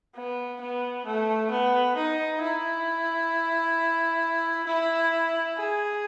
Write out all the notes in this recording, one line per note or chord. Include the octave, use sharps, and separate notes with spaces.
B3
B3
A3
B3
D#4
E4
E4
G#4